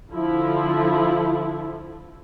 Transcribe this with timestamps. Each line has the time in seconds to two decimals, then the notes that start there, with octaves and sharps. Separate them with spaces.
0.13 D3 F3 E4